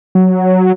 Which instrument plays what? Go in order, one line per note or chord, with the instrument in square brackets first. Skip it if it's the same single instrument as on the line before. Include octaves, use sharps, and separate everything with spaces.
[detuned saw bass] F#3